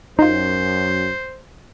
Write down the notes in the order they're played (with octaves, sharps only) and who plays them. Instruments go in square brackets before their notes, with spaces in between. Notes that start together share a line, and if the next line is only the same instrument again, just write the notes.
[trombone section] F#2 [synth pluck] D#4 F4 [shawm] C5